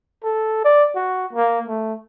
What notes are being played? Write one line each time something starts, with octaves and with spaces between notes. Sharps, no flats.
A4
D5
F#4
A#3
A3